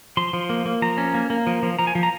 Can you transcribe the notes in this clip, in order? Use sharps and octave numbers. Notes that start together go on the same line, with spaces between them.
F3 C6
F3
A#3
A#3
F3 A#5
C#4
A#3
A#3
F3
F3
F3 A#5
G#5
F3
A#5